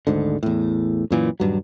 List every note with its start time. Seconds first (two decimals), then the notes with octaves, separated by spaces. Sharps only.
0.07 G#1 D2 G#2 D3
0.43 E2 A2
1.10 F#2 A#2 E3
1.40 D#1 G2 F#3